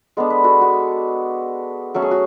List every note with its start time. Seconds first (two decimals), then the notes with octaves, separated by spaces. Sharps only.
0.17 G#3 B3 D4 A4
0.30 B4
0.44 F#4 A4
0.61 F#4
1.94 F#3 A3 C#4 A4
2.02 G#4
2.11 F#4